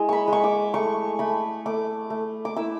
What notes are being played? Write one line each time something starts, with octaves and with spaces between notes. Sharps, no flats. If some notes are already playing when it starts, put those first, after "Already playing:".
Already playing: G#3 E4
B5 C#6
G#3 C#6
D6
A3 C#6
A3 B5
A3 D6
A3
D6
E4 E6